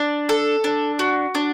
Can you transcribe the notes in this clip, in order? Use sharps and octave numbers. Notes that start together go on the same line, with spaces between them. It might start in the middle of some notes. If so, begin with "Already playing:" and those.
Already playing: D4
A4
D4
F#4
D4